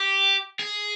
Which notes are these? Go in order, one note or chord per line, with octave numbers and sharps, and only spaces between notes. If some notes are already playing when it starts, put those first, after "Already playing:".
Already playing: G4
G#4